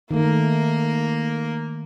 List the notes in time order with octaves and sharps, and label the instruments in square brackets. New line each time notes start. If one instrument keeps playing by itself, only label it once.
[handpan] D#3 A3 [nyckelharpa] A#3 A#4